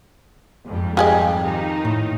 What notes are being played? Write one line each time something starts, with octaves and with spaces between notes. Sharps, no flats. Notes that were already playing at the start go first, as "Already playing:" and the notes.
F2 G#2 G3
F4 G4 G#4 D#5
D#3 D#4
A2